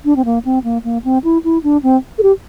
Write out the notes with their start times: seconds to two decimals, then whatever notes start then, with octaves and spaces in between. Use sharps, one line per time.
0.05 D4
0.16 C4
0.25 A#3
0.45 C4
0.64 A#3
0.84 A#3
1.04 C4
1.24 E4
1.44 E4
1.63 D4
1.83 C4
2.18 A4
2.23 G4